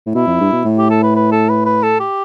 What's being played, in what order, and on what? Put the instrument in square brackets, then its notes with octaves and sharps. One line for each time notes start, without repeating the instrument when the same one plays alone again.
[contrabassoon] A2
[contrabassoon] B2 [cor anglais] E4
[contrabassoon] F2
G2
B2
A2
[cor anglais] G4
A4
B4
B4
A4
B4
B4
A4
G4